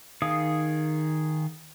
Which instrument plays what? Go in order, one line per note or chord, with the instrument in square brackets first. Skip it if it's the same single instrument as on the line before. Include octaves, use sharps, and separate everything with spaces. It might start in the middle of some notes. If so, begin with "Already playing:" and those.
[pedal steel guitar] D#3 G#4 F5 D#6